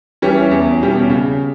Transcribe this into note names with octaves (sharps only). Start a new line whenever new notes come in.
E3 G3 C#4
E2
B2 G3 C#4
C#3